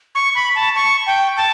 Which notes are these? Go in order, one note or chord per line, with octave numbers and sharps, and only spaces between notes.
C#6
B5
A5
C#6
G5
A5